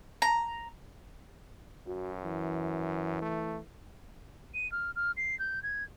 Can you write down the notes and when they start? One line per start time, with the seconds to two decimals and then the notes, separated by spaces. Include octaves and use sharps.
0.22 A#5
1.87 F#2 F#4
2.24 E3
3.22 A3
4.54 D#7
4.72 F6
4.96 F6
5.17 C7
5.39 G6
5.63 G#6